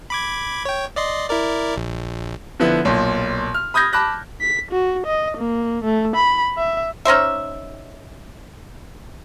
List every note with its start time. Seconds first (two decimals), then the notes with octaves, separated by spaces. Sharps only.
0.10 B5 D6 G#6
0.65 C#5 G5
0.96 D5 D#5 C6
1.28 E4 A#4 D5
1.76 A#1
2.60 D3 F3 B3 E4
2.85 B1 A#2
3.54 F6
3.74 B5 D#6 G6 G#6 A#6
3.93 A5 B5 D6 F#6 A#6
4.41 B6
4.71 F#4
5.06 D#5
5.37 A#3
5.84 A3
6.16 B5
6.58 E5
7.05 C#4 D#4 C5 E5